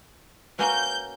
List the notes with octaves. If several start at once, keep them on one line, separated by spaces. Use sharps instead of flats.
A#3 C#4 F#4 B4 D5 A#5 G6